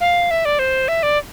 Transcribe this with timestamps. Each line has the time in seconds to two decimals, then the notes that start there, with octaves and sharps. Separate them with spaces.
0.01 F5
0.31 E5
0.45 D5
0.59 C5
0.88 E5
1.03 D5